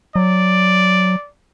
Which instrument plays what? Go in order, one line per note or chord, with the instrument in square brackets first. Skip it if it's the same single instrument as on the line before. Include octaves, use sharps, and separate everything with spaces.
[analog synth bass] F#3 [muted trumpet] D5